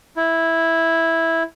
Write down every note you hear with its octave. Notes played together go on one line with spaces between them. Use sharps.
E4